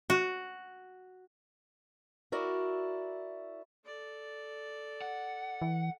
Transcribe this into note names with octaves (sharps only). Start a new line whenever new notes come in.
F#4
E4 F#4 A#4 D5
A4 D5
F#5
E3